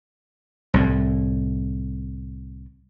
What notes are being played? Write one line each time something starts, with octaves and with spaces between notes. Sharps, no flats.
C2 A2